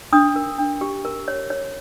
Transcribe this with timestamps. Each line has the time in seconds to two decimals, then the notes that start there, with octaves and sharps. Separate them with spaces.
0.13 D4 D#6
0.36 A#4
0.58 D4
0.81 G4
1.05 A#4
1.28 C#5
1.50 C#5